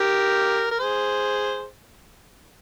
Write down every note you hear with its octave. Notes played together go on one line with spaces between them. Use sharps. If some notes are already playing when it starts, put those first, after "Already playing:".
Already playing: G4 A#4
A#4
G#4 C5